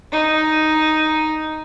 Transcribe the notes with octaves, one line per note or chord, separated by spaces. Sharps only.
D#4